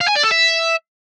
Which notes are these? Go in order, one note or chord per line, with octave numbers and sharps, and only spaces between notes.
F5
G#5
D5
A4
E5